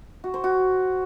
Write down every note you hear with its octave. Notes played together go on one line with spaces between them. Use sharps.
F#4
C5
F#4